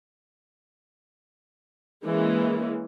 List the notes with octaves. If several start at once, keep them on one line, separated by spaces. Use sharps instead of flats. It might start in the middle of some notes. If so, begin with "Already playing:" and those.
E3 G#3 A#3 C#4